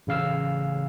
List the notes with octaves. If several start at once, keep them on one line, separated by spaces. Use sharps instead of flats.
A1 C#3 F5 E6